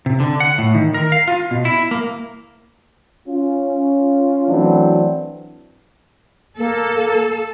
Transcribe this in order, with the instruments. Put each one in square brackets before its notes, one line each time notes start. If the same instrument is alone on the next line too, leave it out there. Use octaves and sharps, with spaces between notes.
[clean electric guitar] C3
D3
F#5
A2
D#3
A#4
F5
F4
B2
E4
A#3
[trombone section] C#4 F4
E3 F#3 A3 C4 D4
[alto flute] A#3 [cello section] A4